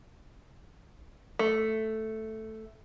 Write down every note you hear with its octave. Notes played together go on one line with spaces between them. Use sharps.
A3